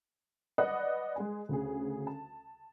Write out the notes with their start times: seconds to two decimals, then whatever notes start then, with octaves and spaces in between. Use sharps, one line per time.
0.58 B4 D5 D#5 F#5 D#6 F#6
1.16 G#3 G#4 G#5
1.49 D2 C#3 G#4
2.07 A5